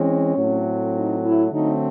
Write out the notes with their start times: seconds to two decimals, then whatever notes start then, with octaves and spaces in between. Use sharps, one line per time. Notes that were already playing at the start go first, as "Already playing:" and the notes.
Already playing: E3 G#3 C4 C#4
0.37 A2 F#3 A3 C4
0.95 D#4
1.24 E4
1.52 D3 F#3 A3 C4 D#4